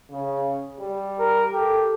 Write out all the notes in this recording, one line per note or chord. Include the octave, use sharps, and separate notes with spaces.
C#3
G3
A#4
G4 A4